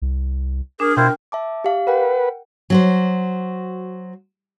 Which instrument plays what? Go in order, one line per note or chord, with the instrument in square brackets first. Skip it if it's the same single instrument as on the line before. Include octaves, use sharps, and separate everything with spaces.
[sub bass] C2
[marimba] D4 [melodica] G#4 [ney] A#4
[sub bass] B2 [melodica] E4 F4 C5 [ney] A#4 [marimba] G5
[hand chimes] E5 A5 D6
G4 F5
[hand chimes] A#4 F#5 G5 [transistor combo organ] B4
[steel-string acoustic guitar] F#3 F#4 C5